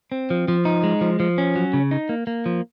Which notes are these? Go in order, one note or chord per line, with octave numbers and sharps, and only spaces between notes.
C4
F3
F3
D#4
G#3
F3
F3
C#4
F#3
C#3
D#4
A#3
A#3
F3